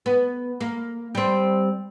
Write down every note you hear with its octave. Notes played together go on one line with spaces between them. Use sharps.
B3
A#3
G3 C4